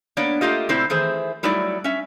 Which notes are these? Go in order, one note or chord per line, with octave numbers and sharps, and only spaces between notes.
A#3 B3 D4 C#5 D5
A3 A#3 F4 G4 D#5
A2 C3 C4 E4 C5 D5
D#3 E3 A3 G#4 C5
F#3 G3 A3 D#4 E4 D5
C#4 E5